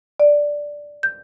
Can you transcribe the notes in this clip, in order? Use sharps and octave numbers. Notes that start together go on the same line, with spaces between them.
D5
G6